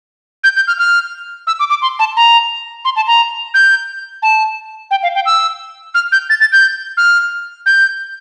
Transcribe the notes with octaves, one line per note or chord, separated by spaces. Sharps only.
G6
G6
F6
F6
E6
D6
D6
C6
A5
A#5
C6
A5
A#5
G6
A5
G5
F5
G5
E6
F6
G6
A6
A6
G6
F6
G6